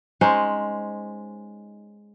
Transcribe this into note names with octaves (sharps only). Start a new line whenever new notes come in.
G#3 C#4 D#4 C5